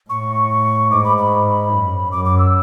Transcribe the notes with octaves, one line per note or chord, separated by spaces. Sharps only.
A2 C#6
G#2 D6
B5
B5
F#2
F#2 D6
D6
E6